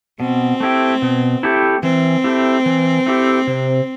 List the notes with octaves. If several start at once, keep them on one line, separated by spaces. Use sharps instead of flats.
B2 C4
A3 E4 G4
B2
A3 E4 G4
E3 C4
A3 E4 G4
E3
A3 E4 G4
C3